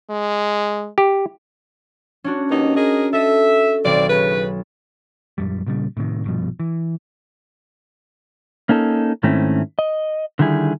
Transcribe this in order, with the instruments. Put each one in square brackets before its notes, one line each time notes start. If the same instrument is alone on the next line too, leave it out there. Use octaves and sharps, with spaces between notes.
[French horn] G#3
[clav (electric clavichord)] G4
[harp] C#4 D4 F#4
[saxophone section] D#2 B2 D#4
G#4 A#4 D#5
[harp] A4 D#5 [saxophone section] E5
[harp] B1 D#3 A6 [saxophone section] C4 D5
[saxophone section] C#3 B4
[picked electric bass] A#1 F#2 G3
A#2 C#3 F#3 G3
A2 C3 D#3
A#1 G2 B2 F3
E3
[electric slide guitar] A#3 C#4 D#4 A4
G#2 D#3 A3 C4 C#4 E4
D#5
D3 D#3 G3 E4 G#4